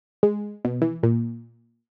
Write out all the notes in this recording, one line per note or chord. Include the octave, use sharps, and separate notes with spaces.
G#3
B2
E3
A#2